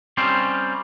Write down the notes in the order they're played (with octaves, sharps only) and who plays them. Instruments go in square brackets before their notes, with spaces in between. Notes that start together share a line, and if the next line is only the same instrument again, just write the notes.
[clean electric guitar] G3 C4 C#4 D#4 C5 F5